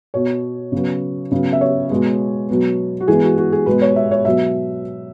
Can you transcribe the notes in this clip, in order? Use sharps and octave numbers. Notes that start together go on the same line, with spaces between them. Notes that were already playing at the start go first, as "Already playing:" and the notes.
B2 B3 C#5
C#3 F#3 B3
C#3 F#3 B3
E5
C#5
B2 G#3 B3
B2 F#3 B3
F#4
E3 G#3 B3 G#4
F#4
F#4
G#4
B2 G#3 B3 B4
C#5
E5
C#5
B2 F#3 B3 E5